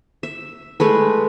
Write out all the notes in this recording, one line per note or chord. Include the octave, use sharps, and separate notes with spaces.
E5
G#3 A3 B4